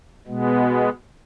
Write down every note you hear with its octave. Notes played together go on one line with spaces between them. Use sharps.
B2 G#3 B3